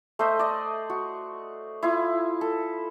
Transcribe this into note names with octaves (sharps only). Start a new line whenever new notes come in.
A3 C5 D#5 E5
D5 D#5
F#4
E4 F4 F5 D#6
A4